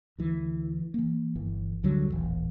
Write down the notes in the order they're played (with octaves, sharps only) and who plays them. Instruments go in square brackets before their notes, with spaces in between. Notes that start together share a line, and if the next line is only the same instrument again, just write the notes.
[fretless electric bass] D2 E3
E3 A#3
G1 E3
D2 D3 F#3 G3
D#1 A1 E2 E3